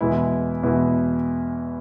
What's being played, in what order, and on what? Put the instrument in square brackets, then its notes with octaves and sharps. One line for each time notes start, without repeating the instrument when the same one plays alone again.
[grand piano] E2 B2 G#3 B3 E4
E2 B2 G#3 B3 E4